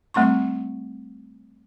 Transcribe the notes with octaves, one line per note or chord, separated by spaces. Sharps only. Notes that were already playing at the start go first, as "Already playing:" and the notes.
G3 A3 C4 C6 C#6